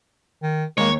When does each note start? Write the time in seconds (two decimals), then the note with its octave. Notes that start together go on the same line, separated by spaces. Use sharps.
0.42 D#3
0.78 D#2 D#3 G#3 A#3 A#4 C#5